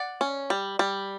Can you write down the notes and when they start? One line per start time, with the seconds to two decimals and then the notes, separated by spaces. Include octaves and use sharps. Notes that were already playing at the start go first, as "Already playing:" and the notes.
Already playing: D5 F#5
0.21 C#4
0.50 G3
0.79 G3